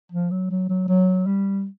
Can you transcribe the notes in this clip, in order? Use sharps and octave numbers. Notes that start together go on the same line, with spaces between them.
F3
F#3
F#3
F#3
F#3
G3